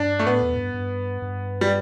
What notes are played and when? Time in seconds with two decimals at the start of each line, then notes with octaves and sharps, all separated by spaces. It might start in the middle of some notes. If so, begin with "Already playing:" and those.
Already playing: G2 D4
0.19 A3
0.26 A2 B3
0.42 E2
0.54 A2
0.58 G2
0.74 G2
1.22 G2
1.61 G3